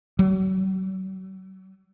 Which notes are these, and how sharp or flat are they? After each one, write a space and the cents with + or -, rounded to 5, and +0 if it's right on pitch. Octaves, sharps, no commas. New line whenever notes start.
F#3 +40